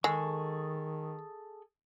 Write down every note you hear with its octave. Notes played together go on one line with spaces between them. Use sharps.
D#3 G#3 G#4 A4 C#6